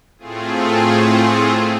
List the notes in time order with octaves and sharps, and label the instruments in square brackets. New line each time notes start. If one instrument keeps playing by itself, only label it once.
[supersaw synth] A2 A3 C4 F4 G#4